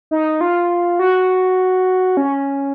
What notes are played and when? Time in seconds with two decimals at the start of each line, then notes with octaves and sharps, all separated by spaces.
0.11 D#4
0.41 F4
0.99 F#4
2.17 C#4